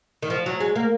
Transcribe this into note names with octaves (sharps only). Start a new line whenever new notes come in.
D#3
F3
F#3
G#3
A#3